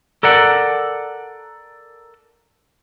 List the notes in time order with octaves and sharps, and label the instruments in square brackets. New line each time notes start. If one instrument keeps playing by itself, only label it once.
[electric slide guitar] A4 A#4 D5 F#5